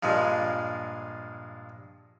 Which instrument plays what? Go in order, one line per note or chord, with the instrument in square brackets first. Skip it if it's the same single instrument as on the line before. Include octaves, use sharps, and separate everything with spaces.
[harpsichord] G2 A#2 F3 G#3